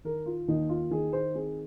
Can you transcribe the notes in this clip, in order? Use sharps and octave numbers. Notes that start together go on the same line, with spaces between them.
D#3 A#4
F4
D#2 D#4
F4
D#3 G#4
C5
C4 G#4